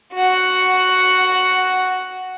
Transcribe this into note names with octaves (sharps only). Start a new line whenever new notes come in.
F#4 F#5